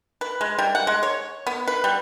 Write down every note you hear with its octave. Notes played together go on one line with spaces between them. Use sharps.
B4
G#3
G3
F#5
G#3
C#5
B3
B4
G3